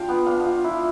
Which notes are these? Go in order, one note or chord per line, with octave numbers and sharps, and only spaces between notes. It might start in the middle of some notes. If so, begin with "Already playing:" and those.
Already playing: D4 F4 F5 G5 A5
B3
D4 F5
F4
E4